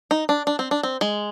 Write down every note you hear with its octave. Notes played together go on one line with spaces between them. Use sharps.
D#4
D4
D4
C4
D4
C4
G#3